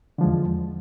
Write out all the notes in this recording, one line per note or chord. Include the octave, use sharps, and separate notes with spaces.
E2 D3 F3 G#3